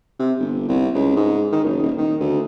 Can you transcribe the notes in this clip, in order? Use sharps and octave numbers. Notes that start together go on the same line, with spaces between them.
C3
G1
C2
C#2
G#2
D#3
F#1
D#1
D#3
D2